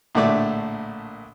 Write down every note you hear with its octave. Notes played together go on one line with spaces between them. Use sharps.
A#1 A2 D3 A3 D5 E5